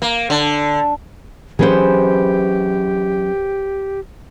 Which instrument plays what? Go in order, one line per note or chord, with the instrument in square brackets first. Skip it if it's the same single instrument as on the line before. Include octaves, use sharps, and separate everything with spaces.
[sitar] A#3
D3
[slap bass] E3 F#3 C#4 [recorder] G4 [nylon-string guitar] G#4 B4 C5